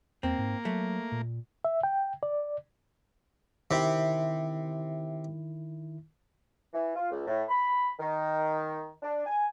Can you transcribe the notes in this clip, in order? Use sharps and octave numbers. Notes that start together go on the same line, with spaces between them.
E2 A#3 C4
G#2
F#3 A3
A#2
E5
G5
D5
C3 D#3 E4
E3
F4
C#2
A2
B5
D#3
D4
G#5